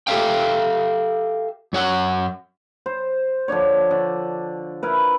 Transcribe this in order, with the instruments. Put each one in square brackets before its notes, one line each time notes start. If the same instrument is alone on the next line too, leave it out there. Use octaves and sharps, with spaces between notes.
[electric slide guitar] G4 A4 E5 F5 G5
F#2 C#5 F#5
[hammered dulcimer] C5
D3 F3 D4 C#5
D3
E4 A#4 B4